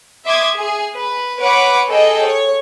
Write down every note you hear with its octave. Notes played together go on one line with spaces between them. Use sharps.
E5 C6 D6 D#6 G#6
G#4
B4
B4 C#5 F#5 D6 D7
G#4 A4 D#5 G5
C#5